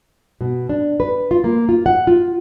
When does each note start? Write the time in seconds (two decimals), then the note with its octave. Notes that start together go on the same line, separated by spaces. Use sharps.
0.41 B2
0.69 D4
1.00 B4
1.31 F4
1.44 A#3
1.69 F4
1.86 F#5
2.07 F4